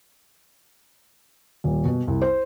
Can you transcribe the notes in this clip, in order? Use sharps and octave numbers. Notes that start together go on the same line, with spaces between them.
D#1
B2
C2
C5